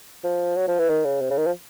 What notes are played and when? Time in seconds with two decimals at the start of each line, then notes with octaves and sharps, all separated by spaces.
0.24 F3
0.56 F#3
0.68 F3
0.79 E3
0.89 D#3
1.05 C#3
1.21 C3
1.30 C#3
1.38 D#3
1.46 F3